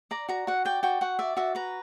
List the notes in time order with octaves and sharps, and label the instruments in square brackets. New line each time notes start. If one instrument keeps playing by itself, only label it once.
[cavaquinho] D5 A#5
F#4 A#5
F#4 F#5
D5 G5
F#4 G5
F#4 F#5
D5 E5
F#4 E5
B4 A#5